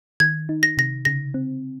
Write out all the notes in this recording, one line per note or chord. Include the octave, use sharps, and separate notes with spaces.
D#3 G#6
D#4
A#6
C3 A#6
C#3 A#6
C4